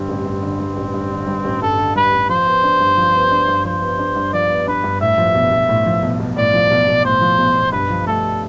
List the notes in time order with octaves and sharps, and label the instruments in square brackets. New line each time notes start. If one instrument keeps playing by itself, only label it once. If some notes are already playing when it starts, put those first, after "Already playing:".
Already playing: [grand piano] G2 D3 G3 [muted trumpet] C4
[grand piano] A1
G2
D3
G3
A1
G2
D3
G3
A1
[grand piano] G2 [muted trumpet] A4
[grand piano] D3
[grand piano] G3 [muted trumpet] B4
[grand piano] A1
[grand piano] F3 [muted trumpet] C5
[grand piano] B3
D4
G2
F3
B3
D4
G2
[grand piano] F3 [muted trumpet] C5
[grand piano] B3
D4
G2
[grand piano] F3 [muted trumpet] D5
[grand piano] B3
[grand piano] D4 [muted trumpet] B4
[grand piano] G2
[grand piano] A2 [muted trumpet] E5
[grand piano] F3
B1
B1
A2
F3
B1
B1
[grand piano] A2 [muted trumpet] D5
[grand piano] F3
B1
B1
[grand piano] A2 [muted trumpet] C5
[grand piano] F3
B1
B1
[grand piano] G2 [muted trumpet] B4
[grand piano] F3
[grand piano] A3 [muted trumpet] A4